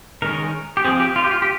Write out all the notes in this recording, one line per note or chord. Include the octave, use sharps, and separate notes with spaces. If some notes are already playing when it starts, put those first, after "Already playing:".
D#3 G#3 C#4 A#4
G4
F3 C4 G#4
G4
F4
G4
F4
G4